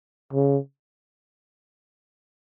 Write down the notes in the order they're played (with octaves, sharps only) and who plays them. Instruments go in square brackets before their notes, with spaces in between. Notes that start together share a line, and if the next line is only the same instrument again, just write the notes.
[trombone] C#3